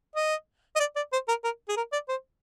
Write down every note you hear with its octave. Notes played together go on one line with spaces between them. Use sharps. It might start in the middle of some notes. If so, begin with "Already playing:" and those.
D#5
D#5
D5
D5
C5
A#4
A#4
G#4
A#4
D5
C5